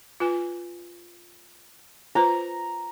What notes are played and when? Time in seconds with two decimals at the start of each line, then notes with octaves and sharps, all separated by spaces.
0.20 F4 B4 G#5
2.15 F4 B4 C5 A#5